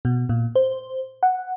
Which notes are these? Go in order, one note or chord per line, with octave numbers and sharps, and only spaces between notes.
B2
A#2
C5
F#5